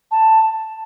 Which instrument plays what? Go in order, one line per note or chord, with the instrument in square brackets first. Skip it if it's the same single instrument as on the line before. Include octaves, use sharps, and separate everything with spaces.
[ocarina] A5